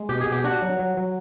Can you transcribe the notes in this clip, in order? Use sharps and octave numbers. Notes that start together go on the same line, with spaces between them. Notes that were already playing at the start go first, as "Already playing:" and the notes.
Already playing: G#3
B2 G4
G#4
B2
G4
D4 F#4
F#3
F#3
F#3